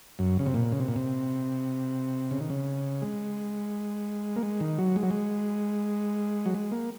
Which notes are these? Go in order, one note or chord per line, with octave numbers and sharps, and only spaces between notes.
F#2
C#3
C3
A#2
C#3
C3
A#2
C3
C#3
D#3
C#3
G#3
A#3
G#3
D#3
F#3
G#3
F#3
G#3
F#3
G#3
A#3